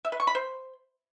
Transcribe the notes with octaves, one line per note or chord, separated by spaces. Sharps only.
E5
B4
C#6
B5
C5